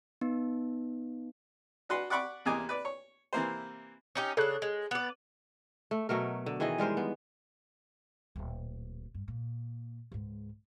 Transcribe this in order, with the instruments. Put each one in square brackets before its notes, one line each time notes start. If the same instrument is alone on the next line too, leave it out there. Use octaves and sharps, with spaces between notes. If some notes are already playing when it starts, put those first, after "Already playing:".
[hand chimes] B3 D#4
[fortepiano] D4 F#4 B4 C6
D5 F#5 B5 C#6 D6
E2 C3 A#3 D#5 G#5 D6
B4 D5
C#5
C3 E3 A#3 C5
[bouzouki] C#4 D#4 G4
[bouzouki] C#3 D4 [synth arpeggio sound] A4 C#5 F#6
[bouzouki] G#3
B3 D5
[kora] A3
B2 F#3 A3 A#4
D3
D#3 E3 G#4 D#5
G3 G#3 A#4 C5
B3
[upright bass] D1 A#2
G2
A#2
C#2 G#2